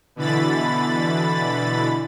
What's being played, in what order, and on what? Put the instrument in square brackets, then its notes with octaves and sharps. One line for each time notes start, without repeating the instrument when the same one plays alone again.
[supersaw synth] B2 D3 E3 B5 A6